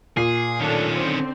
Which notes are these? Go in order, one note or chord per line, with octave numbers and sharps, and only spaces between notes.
A#2 G#4 C7
D#3 A3 C#4 D4 A4
D3 C4